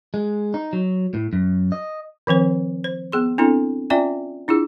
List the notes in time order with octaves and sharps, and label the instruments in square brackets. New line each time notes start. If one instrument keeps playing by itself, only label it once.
[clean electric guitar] G#3
D#4
F#3
A2
F#2
D#5
[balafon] D#3 F3 C4 C5
C5
B3 G#4 C6
C4 D4 E4 A4
C#4 F4 D5 E5 G5 G#5
D4 E4 F4 G#4